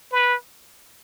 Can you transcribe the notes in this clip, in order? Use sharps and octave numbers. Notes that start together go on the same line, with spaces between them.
B4